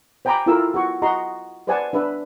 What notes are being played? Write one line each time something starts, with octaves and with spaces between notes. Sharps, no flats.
C5 G5 G#5 A#5 B5 D6
E4 F4 A4 A#4 E6
F#4 C#6
F#4 D#5 A#5 C6
B4 C5 D5 F#5 G#5 A5
D4 B4 E5